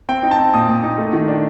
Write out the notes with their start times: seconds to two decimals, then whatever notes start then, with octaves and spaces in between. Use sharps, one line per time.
0.09 C4 G5
0.23 D#4
0.31 A5
0.38 C4
0.54 A#2 D#6
0.69 A#2
0.83 D#4
0.98 A3
1.13 D#3
1.28 D4